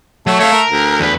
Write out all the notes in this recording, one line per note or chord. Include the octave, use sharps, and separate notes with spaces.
F#3 A3
A3 C#5 F5
A#4
D2
E2 B4